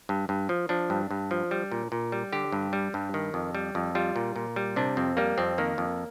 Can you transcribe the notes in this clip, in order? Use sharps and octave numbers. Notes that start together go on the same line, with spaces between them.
G2
G2
F3
F3 D4
G2
G2
F3
G3
A#2
A#2
G3
D3 G4
G2
G3
G2
D#3
F2
G3
F2
G3 F4
A#2
A#2
G3
C3 D4
F2 C4
G3 A#3
F2 C4
D#3 A#3
F2